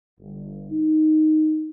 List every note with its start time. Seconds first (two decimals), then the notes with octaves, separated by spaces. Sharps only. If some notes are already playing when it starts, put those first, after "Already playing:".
0.20 G1
0.71 D#4